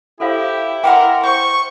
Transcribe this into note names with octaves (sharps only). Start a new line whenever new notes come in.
E4 G4 A4 C5 F5
A#4 B4 F#5 G5 C6 D6
C5 C#6